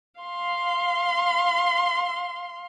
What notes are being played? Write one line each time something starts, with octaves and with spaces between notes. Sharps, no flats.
F5 C6